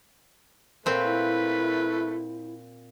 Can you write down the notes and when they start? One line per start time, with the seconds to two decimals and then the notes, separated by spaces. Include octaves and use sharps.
0.86 A#2 A3 C4 B4
1.03 E4